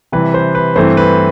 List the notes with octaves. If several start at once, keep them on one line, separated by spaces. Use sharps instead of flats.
C3 E3 G3 B4
C5
B4
G2 E3 A3 C4 C5
B4